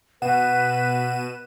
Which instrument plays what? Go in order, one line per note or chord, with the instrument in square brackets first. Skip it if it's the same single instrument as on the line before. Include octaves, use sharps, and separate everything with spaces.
[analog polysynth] B2 D#7 E7 [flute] B4 [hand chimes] F#5